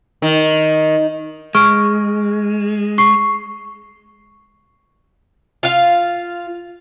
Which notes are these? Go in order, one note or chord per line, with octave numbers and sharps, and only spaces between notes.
D#3
G#3 C#6 F6 D7
C#6 C7
F4 F5